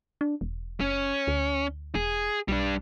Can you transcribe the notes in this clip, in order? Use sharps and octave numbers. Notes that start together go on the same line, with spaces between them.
D4
E1
F#1 C#4
D2
E1 G#4
B1 G3 D4